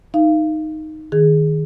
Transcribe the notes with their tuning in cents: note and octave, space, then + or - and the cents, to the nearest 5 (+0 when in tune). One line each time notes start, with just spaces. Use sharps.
D#4 +0 F5 -30
D#3 +0 G#4 +0